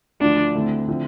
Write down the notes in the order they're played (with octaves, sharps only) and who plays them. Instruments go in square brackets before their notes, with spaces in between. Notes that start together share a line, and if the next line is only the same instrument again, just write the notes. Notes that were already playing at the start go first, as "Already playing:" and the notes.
[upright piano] D2 D3 F3 [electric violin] D4
[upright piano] D2 D3 A3 C4 E4
D3 F3 C4 E4